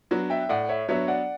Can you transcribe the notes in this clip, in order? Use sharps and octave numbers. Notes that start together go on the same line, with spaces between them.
F#3 B3 D4 F#4
E5 G5
A2 D5 F#5
C#5 E5
F#3 B3 D4 F#4 C#5 E5
D5 F#5